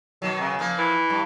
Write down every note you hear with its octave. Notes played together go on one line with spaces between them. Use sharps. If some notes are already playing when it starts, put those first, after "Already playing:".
B2 D#3 F#3
C#3
A#2 F3 A#3
E3
G2